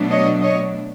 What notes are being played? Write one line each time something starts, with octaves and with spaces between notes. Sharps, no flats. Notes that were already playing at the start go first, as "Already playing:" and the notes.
Already playing: B2 F#3 A3 D4
C#5 D#5
C#5 D#5